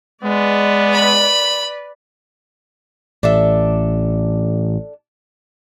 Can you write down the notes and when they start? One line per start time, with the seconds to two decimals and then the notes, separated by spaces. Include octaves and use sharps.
0.24 G#3 B3 B4 D5
0.93 B5
3.23 A1 D4 A4 E5